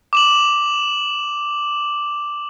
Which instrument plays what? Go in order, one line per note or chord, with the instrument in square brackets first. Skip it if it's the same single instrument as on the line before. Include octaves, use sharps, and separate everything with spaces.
[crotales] D6 E7 F#7